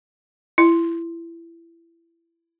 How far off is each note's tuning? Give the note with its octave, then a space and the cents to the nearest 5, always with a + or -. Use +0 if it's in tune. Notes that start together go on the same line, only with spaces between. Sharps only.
E4 +25